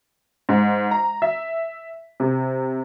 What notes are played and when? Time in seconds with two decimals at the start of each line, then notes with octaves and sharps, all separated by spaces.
0.49 G#2
0.91 A#5
1.22 E5
2.20 C3